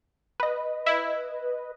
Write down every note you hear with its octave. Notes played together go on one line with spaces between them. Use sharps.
B4 D#5
E4